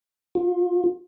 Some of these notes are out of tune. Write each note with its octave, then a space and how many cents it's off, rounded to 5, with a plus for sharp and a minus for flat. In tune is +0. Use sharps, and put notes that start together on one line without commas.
F4 +35